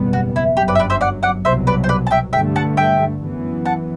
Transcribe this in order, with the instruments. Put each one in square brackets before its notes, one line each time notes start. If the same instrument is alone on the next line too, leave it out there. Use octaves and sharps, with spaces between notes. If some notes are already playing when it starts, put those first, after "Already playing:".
Already playing: [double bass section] F#1 E2 B2 G3 B3
[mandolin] F#4
E4
[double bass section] G1 F#2 F#3 [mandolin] G4
[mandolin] B4 D5
E5
B4 D5
C5 E5
D5 F#5
D5 F#5
[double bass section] C2 B2 F#3 [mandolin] C5 E5
[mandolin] B4 D5
C5
B4 D5
A5
E5 G5
[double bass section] G2 D3 A3 [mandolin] E5 G5
[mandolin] F#5 A5
E5 G5
[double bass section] F#2 E3 B3
[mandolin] F#5 A5